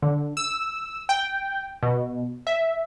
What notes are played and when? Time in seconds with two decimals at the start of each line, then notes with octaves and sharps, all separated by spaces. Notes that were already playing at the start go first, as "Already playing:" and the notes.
0.02 D3
0.37 E6
1.09 G5
1.83 B2
2.47 E5